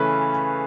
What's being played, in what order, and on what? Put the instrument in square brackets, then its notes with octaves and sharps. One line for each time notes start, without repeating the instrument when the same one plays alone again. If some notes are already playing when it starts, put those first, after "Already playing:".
Already playing: [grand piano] C#3 E3 A3 C#4 B4